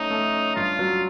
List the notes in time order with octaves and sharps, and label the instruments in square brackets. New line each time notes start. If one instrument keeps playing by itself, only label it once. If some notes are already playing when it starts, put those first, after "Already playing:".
Already playing: [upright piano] A3 C#4 [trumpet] D#4
[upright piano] A3
C#4
[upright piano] G2 [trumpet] F4
[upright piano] F#3